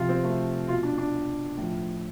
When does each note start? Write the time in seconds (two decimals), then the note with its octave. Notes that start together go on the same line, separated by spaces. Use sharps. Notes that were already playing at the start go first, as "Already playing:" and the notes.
Already playing: C3 F3 F4
0.09 C4
0.24 A3
0.68 B2 F4
0.83 D4
0.98 D4
1.57 A2 F3